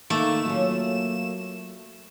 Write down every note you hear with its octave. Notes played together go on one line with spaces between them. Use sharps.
D#3 A3 A#3 E7
F#3 C#4 F4